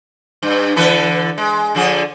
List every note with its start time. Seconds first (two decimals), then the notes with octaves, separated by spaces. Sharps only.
0.43 G2
0.76 D3 E3 B4
1.38 G#3
1.75 D3 F3 G#4